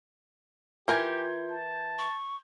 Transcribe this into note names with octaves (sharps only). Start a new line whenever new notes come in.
E3 F4 G4 A#4 G#5 G6 G#6
A5
C#6